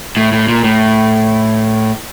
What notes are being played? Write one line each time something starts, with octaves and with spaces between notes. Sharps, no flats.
A2
A2
A#2
A2